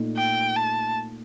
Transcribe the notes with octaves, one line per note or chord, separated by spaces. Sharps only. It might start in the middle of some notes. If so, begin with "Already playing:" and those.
Already playing: A#2 A3 D#4
G5
A5